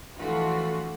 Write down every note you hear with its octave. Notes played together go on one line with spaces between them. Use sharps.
E3 F3 A3 D4 F4 F#4